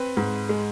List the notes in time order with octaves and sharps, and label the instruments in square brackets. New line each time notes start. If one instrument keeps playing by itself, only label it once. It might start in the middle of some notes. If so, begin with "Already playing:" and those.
Already playing: [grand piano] C4 B4
G#2
G#3